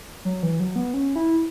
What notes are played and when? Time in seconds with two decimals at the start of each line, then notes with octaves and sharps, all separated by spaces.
0.25 F#3
0.43 E3
0.60 F#3
0.76 B3
0.94 C#4
1.15 E4